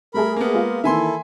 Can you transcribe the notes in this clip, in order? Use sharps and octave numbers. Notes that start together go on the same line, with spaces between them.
G3 A3 G#4 A#4 B5
A#3 B3 A#4
G#3 F4
D#3 E3 A#3 E4 A4 E5 G#5 C6